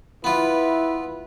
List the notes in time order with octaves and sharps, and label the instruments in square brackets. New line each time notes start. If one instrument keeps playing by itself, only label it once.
[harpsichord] B3 F4 [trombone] E4 [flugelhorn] B4